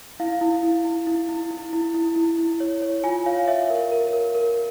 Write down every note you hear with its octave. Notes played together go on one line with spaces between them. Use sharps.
E4 F5
E4
E4
E4
E4
E4
E4
E4
E4
E4
E4
C#5
C#5
F4 G#5
C#5 F5
C#5 E5
A#4
A#4
A#4
A#4